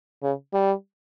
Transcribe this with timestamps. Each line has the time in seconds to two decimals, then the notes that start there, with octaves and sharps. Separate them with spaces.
0.23 C#3
0.53 G3